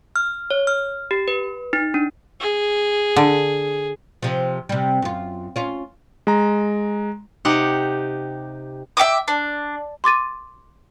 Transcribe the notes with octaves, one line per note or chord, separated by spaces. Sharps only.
F6
C#5
F6
G4
B4
D#4
D4
G#4
D3
C3 F3
C3 G3
F#2 F4
C#4 F4
G#3 A#5
C3 D#4 G4 F#5
E5 G5 D6 D#6
D4
C6 D6 A6 D#7